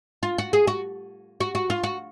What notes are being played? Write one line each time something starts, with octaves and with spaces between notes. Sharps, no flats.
F4
F#4
G#4
F#4
F#4
F#4
F4
F#4